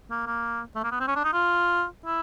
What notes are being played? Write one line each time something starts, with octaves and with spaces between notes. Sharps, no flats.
A#3
A#3
A3
A#3
B3
C4
C#4
D4
D#4
F4
E4